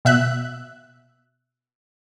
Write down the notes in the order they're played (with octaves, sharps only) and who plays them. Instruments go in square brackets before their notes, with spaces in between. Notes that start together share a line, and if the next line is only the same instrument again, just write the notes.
[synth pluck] B2 E5 F#6